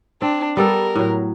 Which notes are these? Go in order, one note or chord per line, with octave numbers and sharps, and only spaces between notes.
C4 D4
G3 B3 A4 A#4
A2 F#3